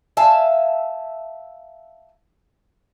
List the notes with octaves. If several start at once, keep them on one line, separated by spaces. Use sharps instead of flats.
E5 F5 G#5 A5